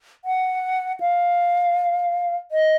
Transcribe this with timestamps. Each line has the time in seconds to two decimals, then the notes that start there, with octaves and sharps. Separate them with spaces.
0.25 F#5
1.00 F5
2.51 D#5